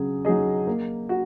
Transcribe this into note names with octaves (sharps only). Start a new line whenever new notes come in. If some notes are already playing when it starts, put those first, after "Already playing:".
Already playing: C#3 F#3 G#4
F#3 D#4 G#4 D#5
A#3
F#4